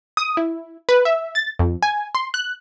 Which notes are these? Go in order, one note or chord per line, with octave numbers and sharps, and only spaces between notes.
D#6
E4
B4
E5
A6
F2
G#5
C6
F#6